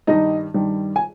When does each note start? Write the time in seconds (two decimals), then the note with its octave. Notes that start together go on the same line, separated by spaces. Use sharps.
0.07 G2 D#3 G3 D#4 D#5
0.54 G2 D#3 G3
0.96 G#5